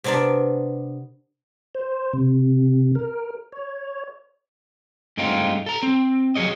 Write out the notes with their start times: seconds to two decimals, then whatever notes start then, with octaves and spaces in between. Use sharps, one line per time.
0.04 C3 B3 D4 A#4 D5
1.75 C5
2.13 C3
2.95 A#4
3.52 C#5
5.17 G2 G#3 A3 C4 D#4 F4
5.66 A4 A#5
5.83 C4
6.35 F3 F#3 G#4 C#5 D#5